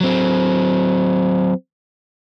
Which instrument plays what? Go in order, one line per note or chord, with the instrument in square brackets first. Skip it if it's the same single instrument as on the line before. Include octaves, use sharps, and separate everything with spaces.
[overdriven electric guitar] F#3 C4